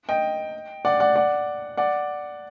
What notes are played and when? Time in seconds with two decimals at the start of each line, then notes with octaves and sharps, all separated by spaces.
0.09 D#5 G5
0.85 D5 F#5
1.00 D5 F#5
1.16 D5 F#5
1.77 D5 F#5